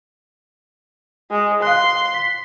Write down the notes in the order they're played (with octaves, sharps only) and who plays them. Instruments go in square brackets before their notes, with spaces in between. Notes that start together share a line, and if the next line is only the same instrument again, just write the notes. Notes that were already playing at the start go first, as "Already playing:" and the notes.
[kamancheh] G#3
[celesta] F5 F#6 [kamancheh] C6
[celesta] B6